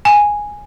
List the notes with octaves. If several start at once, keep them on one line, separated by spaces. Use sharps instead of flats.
G#5